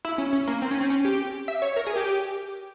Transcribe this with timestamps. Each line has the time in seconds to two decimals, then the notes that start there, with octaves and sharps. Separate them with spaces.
0.05 E4
0.18 C#4
0.33 C#4
0.47 A#3
0.62 C4
0.71 C#4
0.81 C4
0.90 C#4
1.05 G4
1.48 E5
1.62 C#5
1.76 A#4
1.86 G#4
1.96 G4